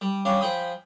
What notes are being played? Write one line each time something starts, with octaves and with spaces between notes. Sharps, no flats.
G3
G3 C#4 D4 F5
F3 G#4 G5 B5 D#6